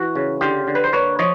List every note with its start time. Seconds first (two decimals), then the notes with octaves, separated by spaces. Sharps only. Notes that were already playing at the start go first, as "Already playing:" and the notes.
Already playing: E3 F#4
0.16 C#3
0.41 D3 F4 G4
0.67 D3
0.75 B4
0.84 C5
0.93 A#3 B4 C#5
1.19 F3 C#5 D#5